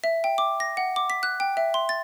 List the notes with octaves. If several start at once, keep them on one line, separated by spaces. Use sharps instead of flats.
E5
G5
D6
A#6
F#5
D6
B6
F#6
G5
E5
C6
A6